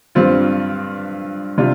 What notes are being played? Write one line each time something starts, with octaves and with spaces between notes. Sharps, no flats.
G2 G3 C4 F4
C3 G3 D4 F4